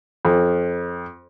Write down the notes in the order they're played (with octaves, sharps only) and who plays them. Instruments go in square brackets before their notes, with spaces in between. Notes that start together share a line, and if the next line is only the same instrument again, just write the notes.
[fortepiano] F2